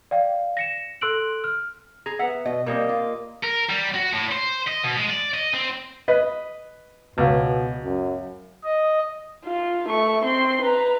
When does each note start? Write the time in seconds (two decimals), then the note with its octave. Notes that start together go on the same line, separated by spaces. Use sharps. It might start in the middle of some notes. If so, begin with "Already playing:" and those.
0.11 D5 F5 G5
0.57 A#6 C#7 E7
1.01 A4 C6 E6 F#6 D7 F#7
1.44 F6
2.06 G#4 A#5
2.19 B3 E5 F#5
2.45 B2 D#5
2.66 A#2 G3 A#3 C4 D#5
2.89 F4
3.43 A#4
3.69 G3
3.94 F#4
4.13 A2
4.32 C5
4.68 D#5
4.84 B2
4.97 G#3
5.10 D5
5.34 D#5
5.54 C4
6.08 B4 D#5
7.18 C#2 B2
7.84 F#2
8.64 D#5
9.45 F4
9.89 A3 C#6
10.25 C4 C6
10.62 B4 A#5